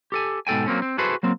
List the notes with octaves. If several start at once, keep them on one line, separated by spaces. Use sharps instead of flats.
G4 A4 G#5
G#2 B2 A4 G5 G#5
F#3 A#3 C4 C#4
C4
E4 F#4 G#4 A4 B4 C5
F#3 A#3 C4